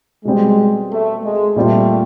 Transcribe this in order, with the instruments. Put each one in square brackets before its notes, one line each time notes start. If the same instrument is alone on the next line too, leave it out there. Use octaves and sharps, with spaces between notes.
[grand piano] B2 G3 C4 [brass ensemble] G#3
[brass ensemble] A3
G#3
[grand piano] A#2 G3 C4 F4 [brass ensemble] A3